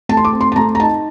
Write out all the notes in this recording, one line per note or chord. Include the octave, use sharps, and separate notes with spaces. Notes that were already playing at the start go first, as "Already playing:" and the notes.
A3 A5
C6
D6
C4
C6
A5
A3 A#5
A#5
D#4 A5